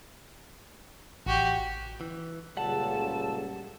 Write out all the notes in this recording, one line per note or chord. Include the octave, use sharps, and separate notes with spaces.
A1 F#4 G4
E3
C#2 F#2 A#2 C#3 G3 A4 F#5 A5